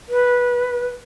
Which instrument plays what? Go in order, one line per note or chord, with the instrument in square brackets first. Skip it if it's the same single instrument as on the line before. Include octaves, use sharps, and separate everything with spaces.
[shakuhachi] B4